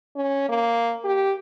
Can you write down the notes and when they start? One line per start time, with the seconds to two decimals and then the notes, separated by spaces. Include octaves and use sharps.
0.16 C#4
0.49 A#3
1.04 G4